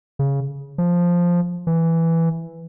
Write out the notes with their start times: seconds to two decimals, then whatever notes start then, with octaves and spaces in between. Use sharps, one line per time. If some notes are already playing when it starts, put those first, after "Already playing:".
0.19 C#3
0.78 F3
1.67 E3